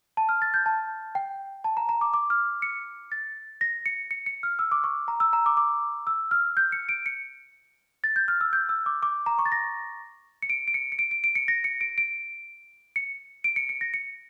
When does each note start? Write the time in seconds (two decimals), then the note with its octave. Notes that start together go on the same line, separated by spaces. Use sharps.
0.17 A5
0.29 F6
0.42 A6
0.54 G6
0.66 A5
1.15 G5
1.64 A5
1.77 A#5
1.89 A#5
2.01 D6
2.14 D6
2.30 F6
2.62 C#7
3.12 A6
3.61 A#6
3.86 C#7
4.11 C#7
4.26 C#7
4.43 F6
4.59 E6
4.72 D6
4.84 C#6
5.08 A#5
5.20 E6
5.33 A#5
5.46 D6
5.57 D6
6.07 E6
6.31 F6
6.57 G6
6.72 C#7
6.89 D7
7.06 C#7
8.04 A6
8.16 G6
8.28 F6
8.41 E6
8.53 G6
8.69 E6
8.86 D6
9.03 D6
9.26 A#5
9.39 C#6
9.45 A6
9.52 A#6
10.42 C#7
10.50 D7
10.68 D7
10.74 C#7
10.92 C#7
10.99 D7
11.11 D7
11.24 D7
11.35 C#7
11.48 A#6
11.64 C#7
11.81 D7
11.98 D7
12.96 C#7
13.44 D7
13.56 C#7
13.69 C#7
13.81 A#6
13.94 C#7